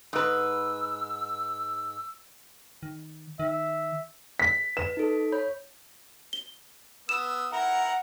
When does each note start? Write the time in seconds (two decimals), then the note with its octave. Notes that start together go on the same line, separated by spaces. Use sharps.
0.13 G#2 B4 E6
2.83 D#3
3.40 D#3 E5
4.39 B6
4.77 B4 E7
4.97 D#4 A4
5.32 C#5 B5 G6
6.33 G7
7.09 B3 D#6 E6 E7
7.52 E4 A#4 F#5 A#5